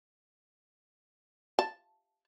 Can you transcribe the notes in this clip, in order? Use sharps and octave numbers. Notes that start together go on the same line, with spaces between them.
A5